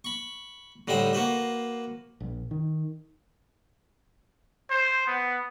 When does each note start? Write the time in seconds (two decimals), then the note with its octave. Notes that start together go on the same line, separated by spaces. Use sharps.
0.05 B5 C#6
0.88 A2 D3 G3 D#4 C5 G5
1.13 A#3 F#4 B4 C5
2.20 A#1
2.51 D#3
4.70 C5
5.07 B3